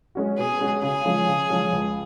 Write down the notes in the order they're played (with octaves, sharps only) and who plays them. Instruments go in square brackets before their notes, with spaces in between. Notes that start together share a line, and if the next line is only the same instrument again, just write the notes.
[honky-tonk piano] G#3 C#4 F#4
[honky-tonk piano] B2 [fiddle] G#4
[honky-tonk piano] G#3 C#4 F#4
[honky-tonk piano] C#3 [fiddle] G#4
[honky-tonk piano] F3 G#3 C#4 F4
C#3
F3 G#3 C#4 F4
C#2